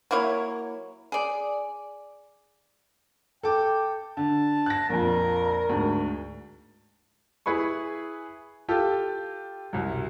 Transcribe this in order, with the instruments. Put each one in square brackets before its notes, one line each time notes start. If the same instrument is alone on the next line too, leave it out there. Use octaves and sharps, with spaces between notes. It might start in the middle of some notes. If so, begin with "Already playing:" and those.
[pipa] F#3 A#3 E4 C#5
G#4 D5
[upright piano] A4 D6 [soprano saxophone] G5
[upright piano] D3 [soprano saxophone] A5
[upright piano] F#6 A#6
[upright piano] A#1 F2 [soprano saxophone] A#4
[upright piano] D2 G#2
[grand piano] E4 G#4 B4 B5 C#6
F4 G4 A4
C2 F#2